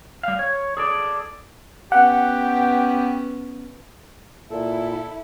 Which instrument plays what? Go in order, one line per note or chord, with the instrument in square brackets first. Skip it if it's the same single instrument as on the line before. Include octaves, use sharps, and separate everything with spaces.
[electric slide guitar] G3 F5
C#5
G#4 A4 D5
[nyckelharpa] B3 C#4 [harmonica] G4 [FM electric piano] F#5
[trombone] A#2 [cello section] E4 [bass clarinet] A4